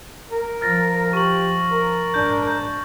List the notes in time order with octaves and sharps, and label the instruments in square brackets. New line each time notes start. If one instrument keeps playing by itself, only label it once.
[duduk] A#4
[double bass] F3 [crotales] F6 A6 A#6
[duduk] G4 [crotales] C#6 F#7
[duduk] A#4
[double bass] G#2 D4 [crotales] G6
[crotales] G6